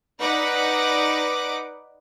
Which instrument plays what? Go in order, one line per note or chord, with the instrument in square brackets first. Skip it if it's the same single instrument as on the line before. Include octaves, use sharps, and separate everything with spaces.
[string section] D#4 B4 D5 F#5 D6